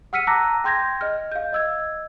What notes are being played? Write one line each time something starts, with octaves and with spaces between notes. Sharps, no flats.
F#5 E6 F6 B6 C#7 D#7
A5 A#5 D6 E6 F#6 A#6
G5 C6 G6 G#6 A#6
D#5 F6
F5 G6
D#5 E6 G#6